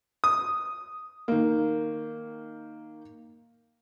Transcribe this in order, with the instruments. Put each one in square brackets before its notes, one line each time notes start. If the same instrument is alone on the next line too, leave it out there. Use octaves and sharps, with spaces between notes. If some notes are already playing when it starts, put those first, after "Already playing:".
[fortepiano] D#6
[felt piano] D#3 A#3